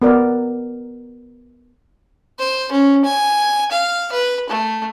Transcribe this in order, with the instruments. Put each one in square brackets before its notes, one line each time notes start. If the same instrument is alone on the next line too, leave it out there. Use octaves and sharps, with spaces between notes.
[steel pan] B3 A#4 D5
[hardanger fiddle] C5
C#4
G#5
F5
B4
A3